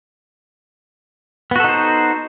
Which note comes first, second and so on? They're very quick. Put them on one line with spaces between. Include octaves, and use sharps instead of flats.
B3 F#4 A4 D#4 C5